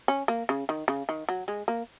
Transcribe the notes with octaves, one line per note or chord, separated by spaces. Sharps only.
C#4
A#3
C#3
D#3
C#3
D#3
F#3
G#3
A#3